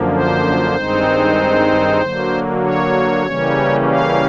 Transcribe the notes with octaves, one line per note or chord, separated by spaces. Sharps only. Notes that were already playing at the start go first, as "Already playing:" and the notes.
Already playing: F#2 D3 F3 A#3
C5
G2 D#3 G#3 C4 D#4
D3 F#3 A#3
C#5
C#3 E3 G3 A#3 C#4
F5